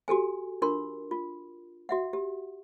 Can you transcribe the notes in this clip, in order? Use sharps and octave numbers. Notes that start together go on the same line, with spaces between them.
F#4 G4 A4 G#5
D4 F4 A#4 C6
F4
F#4 E5 F#5
G4